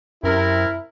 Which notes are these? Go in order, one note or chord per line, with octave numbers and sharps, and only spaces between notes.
F#2 C3 E4 A#4